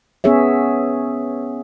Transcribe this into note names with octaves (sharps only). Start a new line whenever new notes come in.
B3 C#4 G#4 C#5 E5